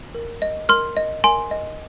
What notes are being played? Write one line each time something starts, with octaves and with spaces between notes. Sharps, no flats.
A#4
D#5
A#4 C6 F6
D#5
A#4 G#5 C6
D#5